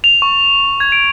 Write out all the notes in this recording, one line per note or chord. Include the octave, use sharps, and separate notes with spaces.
F7
C#6
G#6
D7